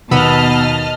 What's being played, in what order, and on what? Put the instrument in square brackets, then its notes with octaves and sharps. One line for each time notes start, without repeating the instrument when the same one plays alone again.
[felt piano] D#2 [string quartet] B2 [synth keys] B3 B5 E6 [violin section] D#5 A5 F6